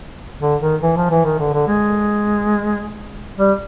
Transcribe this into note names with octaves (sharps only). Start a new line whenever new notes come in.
D3
D#3
E3
F3
E3
D#3
D3
D3
G#3
G3